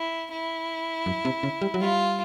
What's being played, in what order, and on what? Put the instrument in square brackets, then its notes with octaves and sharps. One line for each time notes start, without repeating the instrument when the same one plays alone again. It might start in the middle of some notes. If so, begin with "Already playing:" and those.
Already playing: [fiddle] E4
E4
[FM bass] F#2
C3
C#3
G3
F#3
[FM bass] G3 [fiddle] F4